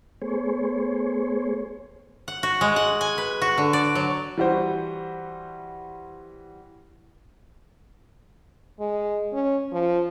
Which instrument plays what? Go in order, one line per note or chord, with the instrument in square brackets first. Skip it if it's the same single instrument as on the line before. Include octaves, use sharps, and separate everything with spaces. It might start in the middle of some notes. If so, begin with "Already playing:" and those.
[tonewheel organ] A3 B3 G#4 C5 C#5
[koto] F#5
F#4
G#3
F#5
G#5
B4
F#4
D3
D5
F#3
[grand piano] E3 G3 F#4 C5
[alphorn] G#3
C#4
F3